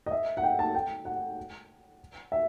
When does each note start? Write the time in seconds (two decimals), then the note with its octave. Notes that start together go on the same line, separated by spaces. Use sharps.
0.06 D#5
0.11 E5
0.37 F#5
0.43 G5
0.59 A5
0.75 G5
1.05 F#5
2.32 E5